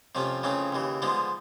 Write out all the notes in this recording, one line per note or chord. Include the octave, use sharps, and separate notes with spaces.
F2 C3 F3 A3 C#4
F2 C#3 E3 A3 C#4
D#2 C#3 E3
D3 F3 G#3 B3 D#4